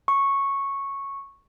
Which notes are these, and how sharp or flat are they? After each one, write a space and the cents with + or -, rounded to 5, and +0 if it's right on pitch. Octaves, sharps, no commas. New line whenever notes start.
C#6 -10